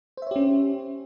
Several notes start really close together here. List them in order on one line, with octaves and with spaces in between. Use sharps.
C5 E5 C#5 G4 C#4